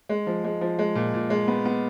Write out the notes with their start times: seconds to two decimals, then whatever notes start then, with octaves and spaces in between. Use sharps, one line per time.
0.09 G#3
0.27 F3
0.44 G#3
0.61 F3
0.79 G#3
0.95 A#2
1.14 A#2
1.30 G#3
1.48 B3
1.65 B3